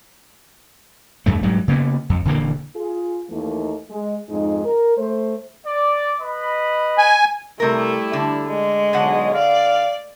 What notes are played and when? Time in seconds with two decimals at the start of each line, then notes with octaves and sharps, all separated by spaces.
1.26 E2 G2 A3
1.43 E1 G#2 F#3 G3
1.68 C#3 A#3 B3
2.10 F2
2.25 D#1 D3 E3 A#3
2.76 F4 G#4
3.30 D#2 E3 A3 A#3 D#4
3.90 G#3
4.29 F2 G#2 G#3 D#4
4.65 A#4
4.98 A3 C5
5.66 D5
6.21 B4 D#5 B5
6.98 G#5
7.60 C3 G3 A3 E4 A#4
8.13 D3
8.48 G#3
8.93 B1 D3 C#5 D#5 F#5
9.34 D5 F5